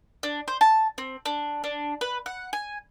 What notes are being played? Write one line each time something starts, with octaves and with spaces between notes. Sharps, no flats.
D4
C5
A5
C4
D4
D4
B4
F#5
G#5